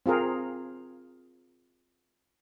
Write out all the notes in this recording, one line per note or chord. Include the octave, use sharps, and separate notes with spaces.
C4 F4 G#4 A#4